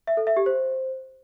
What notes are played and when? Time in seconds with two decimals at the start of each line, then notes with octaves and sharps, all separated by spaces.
0.07 E5
0.17 A4
0.27 E5
0.37 G4
0.46 C5